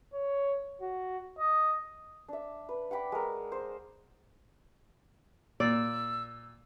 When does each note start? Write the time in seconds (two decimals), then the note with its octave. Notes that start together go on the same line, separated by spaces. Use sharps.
0.14 C#5
0.82 F#4
1.39 D#5
2.28 D4 E5
2.69 B4
2.91 F#5 G5 B5 D6
3.12 G#3 A#4
3.52 C5
5.60 A#2 D5 E6